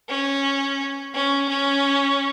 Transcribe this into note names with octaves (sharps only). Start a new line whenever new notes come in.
C#4
C#4
C#4